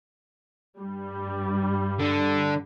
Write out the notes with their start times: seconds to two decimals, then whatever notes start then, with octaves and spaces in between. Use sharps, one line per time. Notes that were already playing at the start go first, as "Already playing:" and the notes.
0.79 G2 G3
1.99 D3